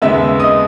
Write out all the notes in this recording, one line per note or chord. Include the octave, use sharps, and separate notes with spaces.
D#2 C#3 G#3 B3 E5 E6
D#5 D#6